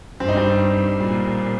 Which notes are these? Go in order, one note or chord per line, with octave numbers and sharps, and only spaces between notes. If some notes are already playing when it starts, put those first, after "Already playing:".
G2 C4
D#4
G3 C4
A#2 G3